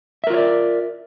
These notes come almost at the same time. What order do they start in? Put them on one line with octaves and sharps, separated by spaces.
E5 A#4 F4 C#5 D5